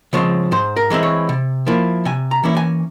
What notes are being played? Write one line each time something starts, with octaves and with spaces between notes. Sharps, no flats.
C#3 F3 G#3 C4 C#5
G#2 C5
A#4
E3 G#3 C4 E4
C#5
C3
F3 A#3 E4
C3 G#5
A#5
E3 A#3 C#4 E4
G#5